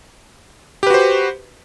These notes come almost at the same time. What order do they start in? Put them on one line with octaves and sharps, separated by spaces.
G4 B4 F#4 C5